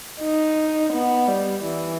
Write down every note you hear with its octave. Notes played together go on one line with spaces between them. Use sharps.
D#4
B3
G3
E3